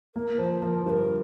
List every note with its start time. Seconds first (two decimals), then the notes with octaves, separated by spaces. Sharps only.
0.15 A#3 A#4
0.38 F3 C5
0.62 F3 A#4
0.86 G2 A#4 C5